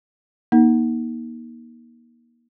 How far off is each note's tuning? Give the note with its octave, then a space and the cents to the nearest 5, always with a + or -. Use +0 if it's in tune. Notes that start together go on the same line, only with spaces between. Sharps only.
A#3 +30 D#4 +15